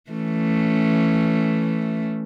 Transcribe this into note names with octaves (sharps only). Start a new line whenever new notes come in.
E3 A3 C#4